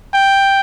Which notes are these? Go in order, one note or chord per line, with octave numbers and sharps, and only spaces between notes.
G5